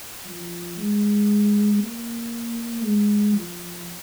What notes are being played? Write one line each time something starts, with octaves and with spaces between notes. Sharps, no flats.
F3
G#3
A#3
G#3
F3